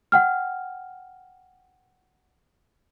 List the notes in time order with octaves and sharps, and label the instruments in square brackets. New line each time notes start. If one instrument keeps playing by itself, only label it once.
[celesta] F#5 G5 F6